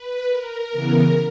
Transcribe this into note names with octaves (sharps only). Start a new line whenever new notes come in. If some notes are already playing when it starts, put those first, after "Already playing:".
Already playing: B4
A#4
C#3 E3 B3